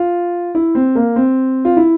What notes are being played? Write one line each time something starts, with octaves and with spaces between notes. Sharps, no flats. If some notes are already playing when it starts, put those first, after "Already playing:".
Already playing: F4
E4
C4
A#3
C4
F4
E4